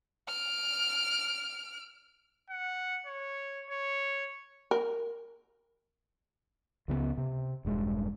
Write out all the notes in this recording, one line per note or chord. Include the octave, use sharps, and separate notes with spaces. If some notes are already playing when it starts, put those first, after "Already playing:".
F6 D7
F#5
C#5
C#5
A#4
C#2 C#3 F3 B3
C3
E1 G2 G#3